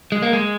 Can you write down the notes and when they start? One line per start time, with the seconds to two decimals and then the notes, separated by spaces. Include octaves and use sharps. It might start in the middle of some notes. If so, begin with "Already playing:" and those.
0.12 G#3
0.22 A#3
0.33 G#3